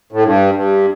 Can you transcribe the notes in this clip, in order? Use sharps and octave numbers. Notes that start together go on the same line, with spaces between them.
A2
G2
G2